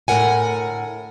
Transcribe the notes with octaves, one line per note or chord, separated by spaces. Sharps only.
D2 A2 C4 A#4 F#5 G#5